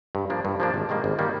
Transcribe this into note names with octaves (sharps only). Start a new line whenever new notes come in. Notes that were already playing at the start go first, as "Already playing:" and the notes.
G2
F3 A#3 D4
G2
F3 A#3 D4
G#1
G#2 D#3 G3 A#3
G#1
D#3 G3 A#3